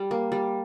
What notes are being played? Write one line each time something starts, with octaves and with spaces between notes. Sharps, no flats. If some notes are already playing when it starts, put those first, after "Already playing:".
Already playing: G3
A#3
G3